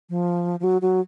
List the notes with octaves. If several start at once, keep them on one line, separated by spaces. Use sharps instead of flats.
F3
F3
F#3
F#3